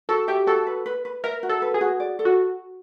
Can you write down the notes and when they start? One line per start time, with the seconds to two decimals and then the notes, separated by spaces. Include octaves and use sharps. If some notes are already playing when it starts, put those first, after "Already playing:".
0.09 F#4 A4
0.28 G4 E5
0.47 F#4 A4
0.67 B4
0.86 B4
1.05 B4
1.24 A#4 E5
1.43 F#4
1.49 A4
1.62 B4
1.74 G#4
1.81 F#4
2.00 D5
2.19 A4
2.25 F#4